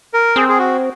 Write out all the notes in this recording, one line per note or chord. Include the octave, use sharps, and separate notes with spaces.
A#4
C4 G#4
G#4
F#4